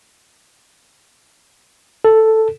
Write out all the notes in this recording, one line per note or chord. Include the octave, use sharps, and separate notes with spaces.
A4